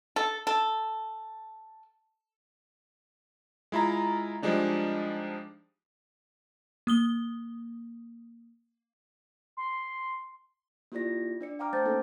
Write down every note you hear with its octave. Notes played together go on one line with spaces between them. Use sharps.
A4
A4
G#3 E4 F4 A#5
F3 G3 G#3 D4 D#4
A#3 D#6 G7
C6
A#3 E4 F4 G4 D5 A#6
D4 D5 C#7
F5 G5 A#5 D6 F6
A3 C5 A5 G6 A6
A#3 C#4 D#4 A4